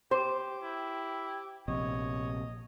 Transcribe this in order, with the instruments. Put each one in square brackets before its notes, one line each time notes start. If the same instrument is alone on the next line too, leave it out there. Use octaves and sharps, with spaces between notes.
[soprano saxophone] G4 [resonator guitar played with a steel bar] C5
[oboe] E4
[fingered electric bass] A#1 C3 [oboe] C#5 [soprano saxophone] D#5